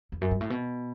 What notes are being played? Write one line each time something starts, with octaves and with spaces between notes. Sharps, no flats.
E2
F#2
G2
A2
B2